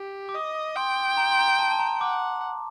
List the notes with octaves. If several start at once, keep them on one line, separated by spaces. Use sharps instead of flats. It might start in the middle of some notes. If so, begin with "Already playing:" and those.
Already playing: G4
D6
D#5 D#6
G5 C6
A#5
C6
A#5
A5
A5
A#5
F#5 D6